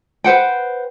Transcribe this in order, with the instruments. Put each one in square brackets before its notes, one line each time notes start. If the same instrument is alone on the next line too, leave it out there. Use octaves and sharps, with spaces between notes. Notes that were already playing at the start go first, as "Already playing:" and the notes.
[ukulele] B4 C5 F#5 G5